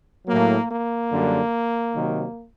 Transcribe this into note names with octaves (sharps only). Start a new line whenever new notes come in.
A2 F#3 A#3
A#3
F#2 D3 G3
C3 D#3 F#3